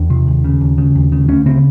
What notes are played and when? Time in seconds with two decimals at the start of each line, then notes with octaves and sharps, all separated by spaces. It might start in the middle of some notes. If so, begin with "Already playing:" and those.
Already playing: E2 D4
0.10 C3
0.28 D#2
0.44 C#3
0.61 D#2
0.78 C#3
0.95 D#2
1.12 C#3
1.28 D2 C#4
1.46 C#3 C4